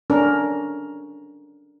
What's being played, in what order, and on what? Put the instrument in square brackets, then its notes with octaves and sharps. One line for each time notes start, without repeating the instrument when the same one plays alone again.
[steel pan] C#4 D4 A#4